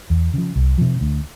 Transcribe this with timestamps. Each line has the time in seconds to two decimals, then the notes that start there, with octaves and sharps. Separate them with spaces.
0.10 E2
0.34 C#3 F3
0.56 C2
0.78 C3 F3
1.01 D2